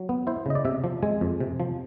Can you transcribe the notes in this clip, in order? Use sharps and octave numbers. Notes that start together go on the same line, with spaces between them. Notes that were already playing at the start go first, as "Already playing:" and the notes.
Already playing: F#3
B3
E4 C5
C#3 D#5
D5
C3 E5
F3
G#3 G#5
F2
C3
F3